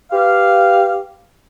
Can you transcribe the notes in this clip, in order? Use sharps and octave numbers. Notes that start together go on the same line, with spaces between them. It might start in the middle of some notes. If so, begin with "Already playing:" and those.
G4 B4 F5